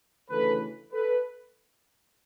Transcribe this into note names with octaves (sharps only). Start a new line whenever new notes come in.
D2 C#3 E3 A4 B4
A4 B4